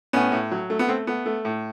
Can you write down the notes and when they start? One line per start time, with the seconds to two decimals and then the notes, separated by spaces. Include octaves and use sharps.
0.13 A2 B3 C#4
0.32 A2
0.52 F#3
0.70 A3
0.79 B3
0.88 A3 C4
1.07 A3 B3
1.26 A3
1.45 A2